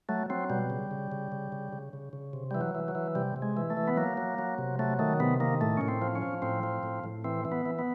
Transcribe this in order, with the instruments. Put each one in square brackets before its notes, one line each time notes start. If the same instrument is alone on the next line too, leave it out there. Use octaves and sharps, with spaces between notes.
[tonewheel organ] F#3 A3
F#3 C4
B2 G3
C#3
C#3
C#3
C#3
C#3
C#3
C#3
C#3
C3
E3 G3
F#3
E3
F#3
E3
C3 G3
C3
G#3
E3
A3
E3
B3
F#3 A#3
F#3
F#3
C3
F#3 A3
D#3 A3
C3 B3
D#3 A#3
A2 A3
A2 C#4
C4
F3
C#4
F3
A2 C4
F3
A2
A2
E3 C4
E3
B3
E3
B3